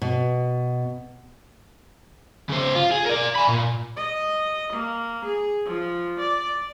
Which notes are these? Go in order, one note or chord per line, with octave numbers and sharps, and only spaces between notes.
B2
C#3 C5
F4
G#4
A#4 D5
G#5 B5
A#2
D#5
A#3
G#4
F3
D5